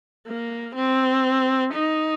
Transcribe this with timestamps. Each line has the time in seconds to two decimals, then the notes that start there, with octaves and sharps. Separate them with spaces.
0.27 A#3
0.76 C4
1.74 D#4